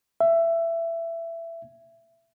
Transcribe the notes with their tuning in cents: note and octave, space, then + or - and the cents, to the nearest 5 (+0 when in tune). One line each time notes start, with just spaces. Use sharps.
E5 +20